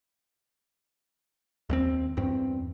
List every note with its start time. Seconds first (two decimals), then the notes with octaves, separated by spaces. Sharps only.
1.70 D#2 G#3 C4
2.17 E2 G2 C4